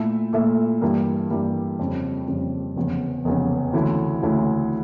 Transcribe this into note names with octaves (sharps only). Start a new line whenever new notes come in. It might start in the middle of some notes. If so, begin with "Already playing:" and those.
Already playing: A#2 A3 E4 A4 E5
A#2 A3 E4 A4 E5
G2 E3 G3 A#3
G2 E3 G3 A#3
F2 C#3 G3
F2 C#3 G3
F1 E2 C#3
F1 E2 C#3
D2 C#3 E3 A3 E4
D2 C#3 E3 A3 E4